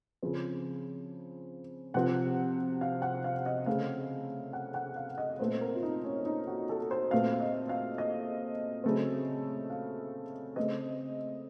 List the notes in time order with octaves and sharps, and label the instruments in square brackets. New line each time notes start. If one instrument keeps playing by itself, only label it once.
[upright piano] C#3 F3 C4
C3 F3 C4 F#5
F5
F#5
F5
D#5
C#3 A3 C4 F5
F#5
F#5
F5
D#5
A#2 A3 C4 C5
A#4
F4
D#4
C#4
D#4
F#4
A4
C5
A#2 A3 C4 F5
F5
D#5
F5
D#5
C#3 F#3 A3 C4
F5
C#3 A3 C4 D#5